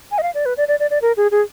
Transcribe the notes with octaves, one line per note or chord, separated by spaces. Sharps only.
G#5
D#5
F5
D5
B4
D5
D5
D5
D5
A#4
G#4
G#4